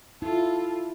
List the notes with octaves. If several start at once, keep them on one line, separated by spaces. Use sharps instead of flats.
E4 F4 A4